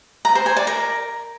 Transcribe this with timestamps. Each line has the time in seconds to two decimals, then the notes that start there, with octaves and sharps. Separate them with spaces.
0.25 A#5
0.35 C5
0.46 G#5
0.57 D5
0.67 A#4